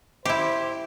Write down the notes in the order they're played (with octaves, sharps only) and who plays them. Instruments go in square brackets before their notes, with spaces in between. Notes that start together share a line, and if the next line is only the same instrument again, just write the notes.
[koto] E4 G4 [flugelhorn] C5